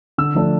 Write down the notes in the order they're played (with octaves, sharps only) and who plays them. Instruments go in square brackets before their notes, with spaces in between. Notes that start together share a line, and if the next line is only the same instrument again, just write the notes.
[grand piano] D3 E6
F3 A3 D4